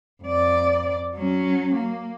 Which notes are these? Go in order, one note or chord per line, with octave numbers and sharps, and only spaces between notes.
F2 D5
F#3 C#4
A#3